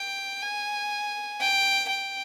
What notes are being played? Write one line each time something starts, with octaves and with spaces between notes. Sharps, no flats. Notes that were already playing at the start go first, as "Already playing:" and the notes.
Already playing: G5
G#5
G5
G5